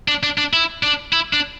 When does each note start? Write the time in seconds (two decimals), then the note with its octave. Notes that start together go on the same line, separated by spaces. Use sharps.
0.08 D4
0.23 D4
0.38 D4
0.53 E4
0.83 D4
1.13 E4
1.33 D4